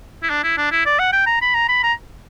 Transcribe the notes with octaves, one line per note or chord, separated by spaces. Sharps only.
E4
D4
E4
D4
E4
D5
F#5
G5
A#5
B5
A#5
B5
A#5